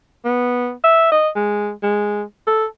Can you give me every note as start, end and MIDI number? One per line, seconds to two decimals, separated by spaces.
0.25 0.71 59
0.84 1.09 76
1.12 1.29 75
1.36 1.71 56
1.83 2.23 56
2.47 2.65 69